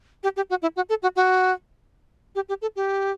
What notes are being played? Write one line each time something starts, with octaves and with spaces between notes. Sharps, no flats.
G4
G4
F#4
E4
F#4
A4
F#4
F#4
G4
G4
A4
G4